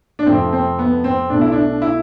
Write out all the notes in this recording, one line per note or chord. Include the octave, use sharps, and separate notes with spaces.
D4
F2 C3 F3 A3 C4
C4
B3
C4
B1 B2 A3 D4
E4
D4
E4